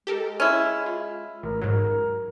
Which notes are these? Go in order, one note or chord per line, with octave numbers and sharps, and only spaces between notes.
G#3 G4 A4 A#4
C#4 E4
F4
A1 A#4
G#2 F#3 A#4